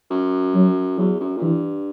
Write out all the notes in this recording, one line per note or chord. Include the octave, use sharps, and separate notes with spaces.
F#2
F#3
E2 F#3
F#2
A#2
G2 E3